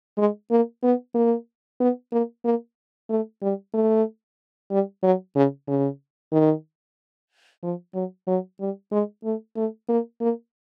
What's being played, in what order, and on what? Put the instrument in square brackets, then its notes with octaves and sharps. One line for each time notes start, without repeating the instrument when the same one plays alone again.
[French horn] G#3
A#3
B3
A#3
B3
A#3
A#3
A3
G3
A3
G3
F#3
C#3
C#3
D#3
F3
F#3
F#3
G3
G#3
A3
A3
A#3
A#3